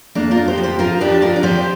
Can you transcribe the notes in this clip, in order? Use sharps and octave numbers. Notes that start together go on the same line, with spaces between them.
F2 A#3 D4
F4 A#4
F2
G4 C5
F3
G4 C5
F3 F4 A#4
F2 D4 G4
F2 F4 A#4
D5
F3 G4 C5